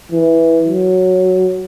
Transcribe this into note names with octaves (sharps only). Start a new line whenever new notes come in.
E3
F#3